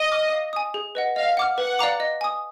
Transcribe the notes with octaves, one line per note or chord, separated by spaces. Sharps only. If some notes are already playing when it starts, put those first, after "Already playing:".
Already playing: D#5
D6 F6
F5
G#5 D#6
G#4
B4 D#5 F#5
D#5 F5
F#5 D6 F6
B4 F#5
D5 F5 A#5 D6
D#5
G#5 D#6